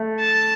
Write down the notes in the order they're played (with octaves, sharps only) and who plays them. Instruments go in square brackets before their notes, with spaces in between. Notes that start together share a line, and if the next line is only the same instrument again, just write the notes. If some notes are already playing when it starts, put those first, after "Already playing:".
Already playing: [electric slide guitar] A3
[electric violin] A5